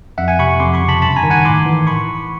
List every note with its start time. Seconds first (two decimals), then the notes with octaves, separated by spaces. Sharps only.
0.18 F2 E5 F#5
0.28 F#5 G#5
0.39 C3 B5 C#6
0.60 F2 C6 D6
0.74 B5 C#6
0.82 C#3
0.88 A5 B5
1.02 G2 A5 B5
1.16 G#5 A#5
1.23 D#3
1.30 F#5 G#5
1.45 A2 C6 D6
1.66 E3
1.87 B5 C#6